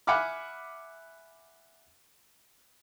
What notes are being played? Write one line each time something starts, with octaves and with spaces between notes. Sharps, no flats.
E5 F#5 G#5 B5 D6 F6